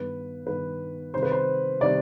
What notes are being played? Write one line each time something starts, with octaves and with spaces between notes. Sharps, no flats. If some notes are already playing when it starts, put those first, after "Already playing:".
Already playing: G2 D#3 B3 B4
G2 D#3 B3 B4
C3 D#3 G3 C5
B4
C5
C3 D#3 G3 D5